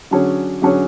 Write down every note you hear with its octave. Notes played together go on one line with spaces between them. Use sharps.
D3 F#3 C#4 G#4 C#5
D3 F#3 C#4 G#4 C#5